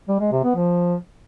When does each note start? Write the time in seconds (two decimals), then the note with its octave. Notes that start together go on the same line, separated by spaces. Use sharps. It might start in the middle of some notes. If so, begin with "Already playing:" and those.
0.08 G3
0.20 G#3
0.32 C3
0.43 B3
0.55 F3